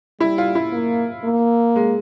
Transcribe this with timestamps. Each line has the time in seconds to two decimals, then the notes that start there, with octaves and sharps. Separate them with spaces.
0.20 G3 E4
0.38 F4
0.55 E4
0.72 A#3
1.24 A#3
1.76 G#3